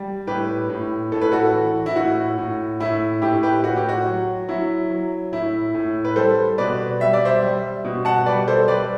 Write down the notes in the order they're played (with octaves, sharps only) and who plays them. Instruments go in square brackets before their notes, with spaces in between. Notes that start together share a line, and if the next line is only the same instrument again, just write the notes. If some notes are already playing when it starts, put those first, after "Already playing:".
Already playing: [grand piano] G3
A2 G4 B4
A2
A2 A4
B4
F#4 A4
E3
E4
A2 F#4
A2
A2 E4
A2 E4 G4
G4 B4
A2 F#4
G4
F#4
F#3
F#3 E4
F#3
A2 E4
A2
B4
G3 A4 C5
B2 B4 D5
G3 E5
D5
C5 E5
G3
B2
F#5 A5
G3 B4 D5
A4 C5
G3 B4 D5